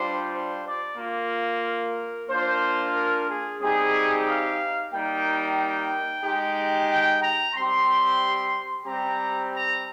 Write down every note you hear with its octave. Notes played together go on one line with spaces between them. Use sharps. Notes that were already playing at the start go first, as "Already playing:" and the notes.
Already playing: G3 D4 F4 C5
C5
D5
A#3 F4
A#4
A#3 D4 F4 C5
A#4
G#4
G3 C4 D#4 G4 G#4
F5
G3 A#3 D#4 G5
G5
G#3 D#4 G4
G5
A#5
G3 C4 G4 C6
G3 C4 G4 A#5
A#5